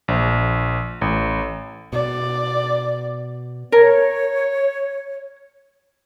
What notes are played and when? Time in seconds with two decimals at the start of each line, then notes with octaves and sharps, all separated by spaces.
0.08 A#1
1.01 A1
1.93 B2 D5
3.72 A#4 C#5